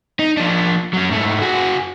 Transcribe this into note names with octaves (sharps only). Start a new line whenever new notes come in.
D#4
F3 D4
F#3 C#4
G#2 A3
F#4 G#4